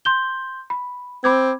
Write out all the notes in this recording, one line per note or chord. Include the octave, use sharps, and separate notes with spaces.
C6 G6 G7
B5
C4 B5 D6 G#6